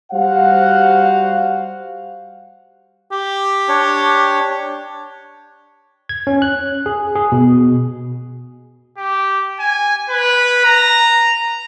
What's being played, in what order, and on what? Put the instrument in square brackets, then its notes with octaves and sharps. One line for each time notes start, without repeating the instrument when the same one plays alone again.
[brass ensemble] G3 F#4 C5 F5 F#5
[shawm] G4
[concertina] D4 C#5
[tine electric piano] G#6
C#4
F#6
G#4
G#4
B2
[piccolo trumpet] G4
G#5
B4
A#5